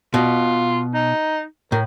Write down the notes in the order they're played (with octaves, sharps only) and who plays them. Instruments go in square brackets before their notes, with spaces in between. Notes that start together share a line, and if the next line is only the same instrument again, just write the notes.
[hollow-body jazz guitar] B2 [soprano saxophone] F4
[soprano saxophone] D#4
[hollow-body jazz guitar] A2 [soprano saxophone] A#4